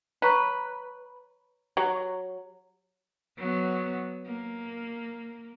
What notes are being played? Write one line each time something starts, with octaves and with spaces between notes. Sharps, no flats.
B4 C#5 A#5 C#6
F#3 G4
F#3 B3
A#3